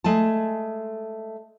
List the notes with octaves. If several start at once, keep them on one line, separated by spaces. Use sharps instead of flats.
G#3 A3 G#5 A5